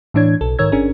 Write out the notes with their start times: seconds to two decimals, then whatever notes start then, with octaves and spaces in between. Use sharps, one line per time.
0.14 A2 E3 D4 C#5 G#6
0.41 B1 A4
0.59 G#2 D#3 A#4 C#5 E6 G#6
0.72 G1 C#4 D4 G#4 A#4